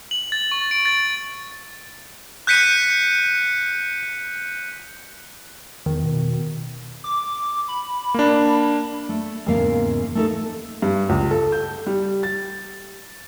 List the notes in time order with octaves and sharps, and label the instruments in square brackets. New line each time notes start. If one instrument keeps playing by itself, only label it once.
[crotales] F#7
A6
C#6
D7
A6
F#6 G6 B6 C#7 D#7
[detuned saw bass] E2 [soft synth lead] D#3
[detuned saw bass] B2
[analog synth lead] D6
B5
[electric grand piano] A#3 D4
[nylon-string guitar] A3
E2 G#2 C#3 A#3 F5
A3 D#4 A4
[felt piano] G2
C#2
A4
G6
G3
A6